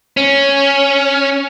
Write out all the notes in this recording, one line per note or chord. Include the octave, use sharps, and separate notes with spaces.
C#4